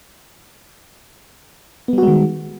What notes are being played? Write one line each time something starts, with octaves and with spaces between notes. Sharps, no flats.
D#3 G3 G#3 B3 F#4